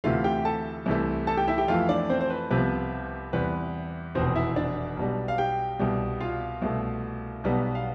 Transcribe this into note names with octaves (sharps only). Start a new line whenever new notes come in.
D2 C3 E3 A3 F4 F5
G4 G5
A4 A5
C2 C3 E3 A3
A4 A5
G4 G5
E4 E5
G4 G5
F2 E3 A3 F4 F5
D4 D5
C4 C5
C5
B4
C2 C3 F3 B3 B4
E2 C3 G3 B4
F1 E2 B2 C4 C5
E4 E5
D4 D5
B1 B2 G3
F5
G4 G5
C2 B2 G3
F4 F5
C2 B2 A3
B1 B2 G3 B3
F5